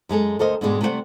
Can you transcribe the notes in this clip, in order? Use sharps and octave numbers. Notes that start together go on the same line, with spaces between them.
F#2 G#3 G#4 A4
D2 A4 A#4 C5 D#5
G#2 B2 D3 G3 G#3
C3 G3 A3 A4 C5 F#5